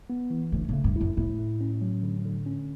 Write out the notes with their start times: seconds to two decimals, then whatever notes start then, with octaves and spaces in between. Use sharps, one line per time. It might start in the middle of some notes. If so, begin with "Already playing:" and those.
0.10 B3
0.30 E3
0.52 D3 A3
0.69 C#3 A3
0.84 G2
0.96 F#2 E4
1.17 A2 E4
1.39 A3
1.61 C#4
1.82 F#3
2.03 D3
2.25 D3
2.46 C#4